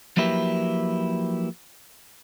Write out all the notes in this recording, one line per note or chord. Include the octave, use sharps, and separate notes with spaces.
F3 F#3 A#3 E4 G4 B4